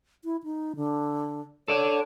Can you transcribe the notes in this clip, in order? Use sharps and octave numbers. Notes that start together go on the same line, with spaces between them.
E4
D#4
D3
A4 C#5 D5